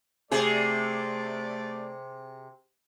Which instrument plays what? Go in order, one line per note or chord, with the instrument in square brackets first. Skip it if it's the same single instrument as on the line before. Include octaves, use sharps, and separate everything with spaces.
[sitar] C3 G#4 [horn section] A3 D5